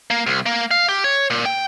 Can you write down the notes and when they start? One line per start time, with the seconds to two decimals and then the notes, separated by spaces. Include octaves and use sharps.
0.10 A#3
0.26 C2
0.46 A#3
0.71 F5
0.89 G4
1.04 C#5
1.30 A#2
1.45 G5